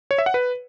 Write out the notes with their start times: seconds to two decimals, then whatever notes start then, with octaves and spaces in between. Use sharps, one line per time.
0.11 C#5
0.18 E5
0.26 F#5
0.34 B4